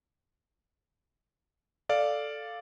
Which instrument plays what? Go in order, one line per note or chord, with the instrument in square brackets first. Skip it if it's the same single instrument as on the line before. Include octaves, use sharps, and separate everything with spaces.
[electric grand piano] A4 D5 F5